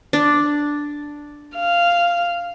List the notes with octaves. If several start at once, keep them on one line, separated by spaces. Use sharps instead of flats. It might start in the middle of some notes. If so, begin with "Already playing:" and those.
D4
F5